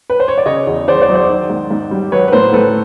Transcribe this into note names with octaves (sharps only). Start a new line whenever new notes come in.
B4
C5
C#5
D5
C#3 C#5 D#5
E2
E2 C5 D5
C5 D5
F#3
C5 D5
D#3
G#2
G#2
G3
F#3 B4 C#5
B4
A2 A#4 C5
A2 A4 B4